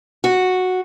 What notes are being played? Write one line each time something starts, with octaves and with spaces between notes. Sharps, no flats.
F#4